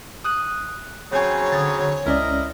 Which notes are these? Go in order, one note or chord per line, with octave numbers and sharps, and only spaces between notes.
D#6 F#6 D#7
C#3 F#3 C4 C#5 G#5
D3 D#6 A6
C#2 C#4 E4 A#4 D5 D#5